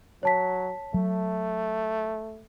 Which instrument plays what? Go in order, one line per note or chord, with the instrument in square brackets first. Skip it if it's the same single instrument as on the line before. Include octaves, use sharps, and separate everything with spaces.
[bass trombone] F#3 [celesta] C#5 A5 B6
[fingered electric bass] F#3 [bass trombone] A3